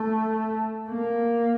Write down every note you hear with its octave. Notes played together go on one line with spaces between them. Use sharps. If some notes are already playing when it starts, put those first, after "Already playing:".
Already playing: A3
A#3